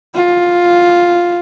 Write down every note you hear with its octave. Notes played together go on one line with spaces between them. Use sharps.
F4